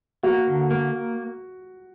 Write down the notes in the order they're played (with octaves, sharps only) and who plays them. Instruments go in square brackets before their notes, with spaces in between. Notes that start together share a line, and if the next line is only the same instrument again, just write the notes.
[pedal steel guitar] A#3 [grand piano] F#4
[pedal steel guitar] D3
A#3